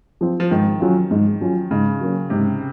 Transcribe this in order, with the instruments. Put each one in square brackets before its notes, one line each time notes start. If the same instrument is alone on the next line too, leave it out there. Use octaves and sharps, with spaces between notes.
[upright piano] F3 C4 F4
[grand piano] F3
[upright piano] G#2 [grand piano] D#3
[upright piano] F#3 C#4 F4
G#2
F#3 C#4 F4
[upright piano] G#2 [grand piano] C#3
[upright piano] F#3 A#3 C#4
[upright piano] G#2 [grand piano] C3